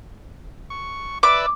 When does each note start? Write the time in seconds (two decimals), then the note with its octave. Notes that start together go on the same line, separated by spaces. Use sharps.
0.70 C#6
1.23 B4 D5 E5 D6